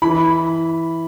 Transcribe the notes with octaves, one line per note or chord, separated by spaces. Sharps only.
E3 B5